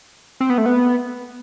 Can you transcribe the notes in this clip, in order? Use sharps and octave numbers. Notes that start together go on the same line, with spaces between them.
C4
B3
A3
B3